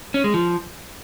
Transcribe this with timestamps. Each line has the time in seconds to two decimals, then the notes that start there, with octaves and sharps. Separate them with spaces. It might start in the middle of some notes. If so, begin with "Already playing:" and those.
0.14 C#4
0.24 G#3
0.34 F3